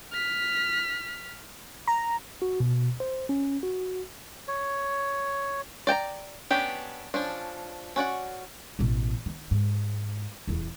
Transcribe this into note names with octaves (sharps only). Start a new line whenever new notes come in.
F6 B6
A#5
F#4
B2
C5
C#4
F#4
C#5
D5 G5 A5 A#5
B3 C#4 D4 G4
F3 C#4 D4
C#4 F#4 D5 F#5
A1 B2
D#3
G#2
D#1 E2